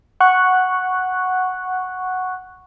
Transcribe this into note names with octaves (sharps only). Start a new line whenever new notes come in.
F#5 C#6 F#6